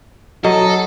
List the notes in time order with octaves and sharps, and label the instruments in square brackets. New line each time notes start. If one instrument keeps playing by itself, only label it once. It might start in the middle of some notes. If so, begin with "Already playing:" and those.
[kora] F#3 [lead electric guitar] A4 [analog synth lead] D#5